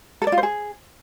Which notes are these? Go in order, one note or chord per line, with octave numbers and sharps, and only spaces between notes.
A4
D5
F4
C5
G#4